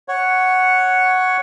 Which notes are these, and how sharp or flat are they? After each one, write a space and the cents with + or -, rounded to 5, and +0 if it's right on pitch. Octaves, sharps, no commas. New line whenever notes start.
C#5 +0 F#5 +0